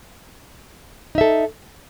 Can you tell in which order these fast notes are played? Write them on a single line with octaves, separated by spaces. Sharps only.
D#4 E5 A4